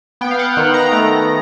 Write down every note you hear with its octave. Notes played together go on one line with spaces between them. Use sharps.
B3 G5
F5
F#5
D#3
A#5
A3 A#5